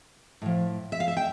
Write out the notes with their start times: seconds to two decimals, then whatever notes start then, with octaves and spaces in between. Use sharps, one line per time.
0.42 A2 F3
0.92 E5
1.00 F5
1.08 E5
1.17 G5